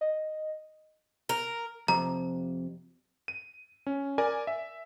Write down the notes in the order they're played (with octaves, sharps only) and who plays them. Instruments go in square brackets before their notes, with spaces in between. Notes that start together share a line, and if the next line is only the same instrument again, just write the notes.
[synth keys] D#5
[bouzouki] A#4
[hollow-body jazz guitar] F2 C3 [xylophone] A#5
[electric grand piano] D#7
C#4
A#4 D5 G#5
E5